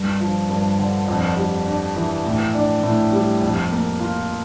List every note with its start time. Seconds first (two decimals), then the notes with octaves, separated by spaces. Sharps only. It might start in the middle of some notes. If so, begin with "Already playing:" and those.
Already playing: G2
0.20 F3
0.49 G2
0.79 D3
1.08 F2
1.37 G3
1.67 D4
1.96 E3
2.24 A2
2.55 D4
2.83 A2
3.13 G3
3.42 F2
3.72 A#3
4.00 F4